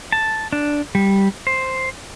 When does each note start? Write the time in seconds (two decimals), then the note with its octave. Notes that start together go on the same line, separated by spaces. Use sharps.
0.12 A5
0.53 D4
0.95 G3
1.47 C5